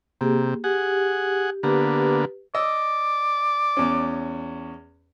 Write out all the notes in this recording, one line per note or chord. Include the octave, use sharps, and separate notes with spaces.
C3 A#3 G4 G#4
G4 G#4 F#5
D3 A#3 B3 G4 B4
D5 D#5 E6
E2 C#4